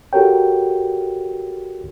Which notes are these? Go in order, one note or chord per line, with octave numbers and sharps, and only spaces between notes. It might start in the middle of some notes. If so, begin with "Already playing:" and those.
F#4 G4 A4 A#4 C#5 G5